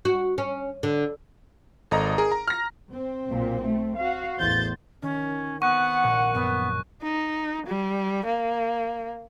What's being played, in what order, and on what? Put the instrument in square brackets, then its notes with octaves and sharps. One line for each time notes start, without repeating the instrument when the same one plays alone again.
[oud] F#4
C#4
D3
[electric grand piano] G#1 [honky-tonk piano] A4 D#5 A#5
[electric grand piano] G#4 [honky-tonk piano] A#4
[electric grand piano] A#5
[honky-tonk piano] F6 A#6
[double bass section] C4
[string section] B1 A#2
A3
F#4 F5
[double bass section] A1 E2 [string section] C5 G6 A6
[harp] D#3 [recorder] C#4
[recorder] B3 [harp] C4 [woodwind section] F#5 [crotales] C#6 F#6
[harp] A#1 A#2 F#4
[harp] F#2 [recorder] B3
[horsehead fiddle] D#4
G3
A#3